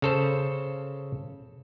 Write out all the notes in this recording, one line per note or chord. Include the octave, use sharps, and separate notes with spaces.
C#3 A4 C5